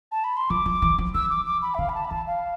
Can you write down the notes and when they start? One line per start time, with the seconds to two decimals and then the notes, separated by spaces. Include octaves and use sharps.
0.12 A5
0.24 B5
0.37 C6
0.50 F3 D6
0.66 F3
0.82 E3
0.98 F3
1.14 E3 E6
1.30 D6
1.46 D6
1.62 B5
1.75 E5
1.79 D3 F5
1.89 B5
1.95 A5
2.05 B5
2.10 E3 A5
2.27 F5